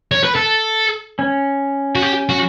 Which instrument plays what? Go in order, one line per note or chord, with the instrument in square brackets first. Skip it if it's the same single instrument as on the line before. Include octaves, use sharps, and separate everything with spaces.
[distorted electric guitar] C#5
B4
A4
[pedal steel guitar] C#4
[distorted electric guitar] F#4
G4
F#4